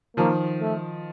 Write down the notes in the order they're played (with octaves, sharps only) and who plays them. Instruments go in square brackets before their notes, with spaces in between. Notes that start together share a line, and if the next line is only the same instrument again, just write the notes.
[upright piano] D#3 F3 [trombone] A#3
[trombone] A3